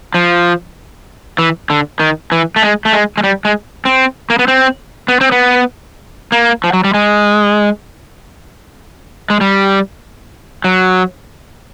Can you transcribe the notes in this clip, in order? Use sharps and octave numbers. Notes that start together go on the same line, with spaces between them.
F3
E3
D3
D#3
E3
A3
G#3
A3
G#3
G#3
G3
G#3
C4
A#3
B3
C4
B3
C4
B3
A#3
F3
F#3
G3
G#3
G#3
G3
F#3